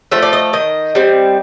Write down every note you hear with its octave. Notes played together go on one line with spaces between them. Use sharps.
F3 A3 E5
D5
D#5
D#3 D#5
G3 C4